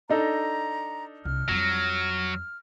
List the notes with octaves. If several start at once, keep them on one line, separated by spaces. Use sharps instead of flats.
D4 D#4 A4 A#5
C2 F6
F2 F#3 G3